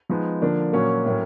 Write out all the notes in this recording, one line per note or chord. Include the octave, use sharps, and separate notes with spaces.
F3 G#3 B3 D#4
D3 F3 A#3 D4
A#2 F#3 A#3 C#4 F#4
A2 F#3 A#3 C#4